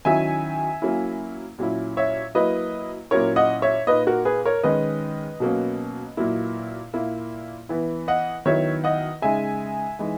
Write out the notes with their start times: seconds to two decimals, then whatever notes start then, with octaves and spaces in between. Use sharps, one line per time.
0.05 D#3 F#3 C#4 E4 E5 G#5
0.82 F#3 A#3 C#4 E4
1.58 A#2 F#3 C#4 E4
1.97 C#5 E5
2.35 F#3 A#3 E4 B4 D#5
3.11 A#2 F#3 C#4 E4 A#4 C#5
3.36 D#5 F#5
3.62 C#5 E5
3.87 A#2 A#3 D#4 B4 D#5
4.07 F#4 A#4
4.25 G#4 B4
4.45 A#4 C#5
4.63 D#3 G#3 C#4 B4 D#5
5.40 B2 F#3 A#3 C#4
6.17 A#2 F#3 A#3 E4
6.93 A#2 A#3 E4
7.69 E3 B3 E4
8.08 D#5 F#5
8.45 D#3 F#3 B3 E4 C#5 E5
8.84 D#5 F#5
9.22 C#3 G#3 D#4 E5 G#5
9.99 E3 G#3 D#4